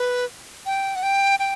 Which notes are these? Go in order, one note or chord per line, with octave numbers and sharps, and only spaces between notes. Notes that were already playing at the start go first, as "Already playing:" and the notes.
Already playing: B4
G5
F#5
G5
G5